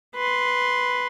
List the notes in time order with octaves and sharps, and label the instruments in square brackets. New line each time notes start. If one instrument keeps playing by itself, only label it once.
[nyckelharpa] B4 C6